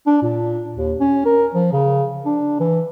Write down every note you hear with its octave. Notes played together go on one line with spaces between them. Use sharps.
D4
A#2
D#2
C#4
A#4
F3
C#3
D4
E3